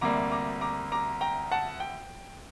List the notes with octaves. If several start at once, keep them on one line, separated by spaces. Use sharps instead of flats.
D2 C3 G3 A#3 A#5 D6
A#5 D6
A#5 D6
A#5 D6
G5 A#5
F#5 A5
G5